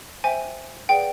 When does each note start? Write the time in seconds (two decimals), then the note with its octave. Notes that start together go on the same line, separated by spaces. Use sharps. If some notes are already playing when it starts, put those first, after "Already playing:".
0.24 C5 E5 G5 G#5
0.89 G#4 B4 D5 F#5 G5